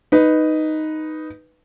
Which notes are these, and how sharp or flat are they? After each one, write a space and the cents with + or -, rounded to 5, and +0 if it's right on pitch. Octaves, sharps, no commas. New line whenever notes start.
D#4 +0 B4 +0